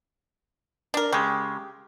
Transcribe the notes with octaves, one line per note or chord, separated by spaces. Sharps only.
D4 A#4
C#3 G#3 G4